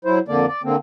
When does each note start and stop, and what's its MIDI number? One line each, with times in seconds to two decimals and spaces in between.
0.05 0.19 54
0.05 0.19 64
0.05 0.19 72
0.28 0.46 41
0.28 0.46 50
0.28 0.46 58
0.28 0.46 74
0.48 0.62 74
0.64 0.76 50
0.64 0.76 58
0.64 0.76 60